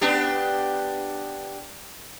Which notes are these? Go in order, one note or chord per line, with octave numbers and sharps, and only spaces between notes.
B3 D4 G4